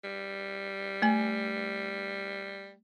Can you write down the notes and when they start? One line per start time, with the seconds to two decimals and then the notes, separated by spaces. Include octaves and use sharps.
0.04 G3
1.02 A3 G#5